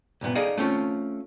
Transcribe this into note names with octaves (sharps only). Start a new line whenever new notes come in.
C2 F#2 A#2 B3
D#4 G#4 A4 D5 D#5 F5
A3 C4 C#4 F4